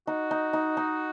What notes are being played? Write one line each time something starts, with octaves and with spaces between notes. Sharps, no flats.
D#4 F#4
D#4
D#4
D#4